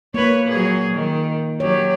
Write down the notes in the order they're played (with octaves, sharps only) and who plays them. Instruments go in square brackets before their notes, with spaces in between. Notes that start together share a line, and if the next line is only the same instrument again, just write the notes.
[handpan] A#3 [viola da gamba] B4 C#5
[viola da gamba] F#3 G#4
D#3
[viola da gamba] F#3 G4 [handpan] C#5